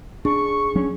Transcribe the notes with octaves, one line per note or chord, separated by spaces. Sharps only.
D4 G#4 C#6
F#3 C#4 D4